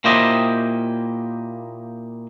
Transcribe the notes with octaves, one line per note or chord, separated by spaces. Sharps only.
A#2 A#3 E4 G4 C5 D#5